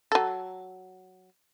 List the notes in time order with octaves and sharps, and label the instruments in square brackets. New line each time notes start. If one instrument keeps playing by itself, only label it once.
[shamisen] F#3 A4